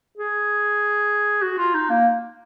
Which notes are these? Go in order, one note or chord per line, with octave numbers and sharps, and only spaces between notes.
G#4
F#4
F4
D#4
A#3